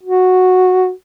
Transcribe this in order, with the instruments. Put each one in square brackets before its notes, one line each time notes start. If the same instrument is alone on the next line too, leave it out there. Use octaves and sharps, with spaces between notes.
[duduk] F#4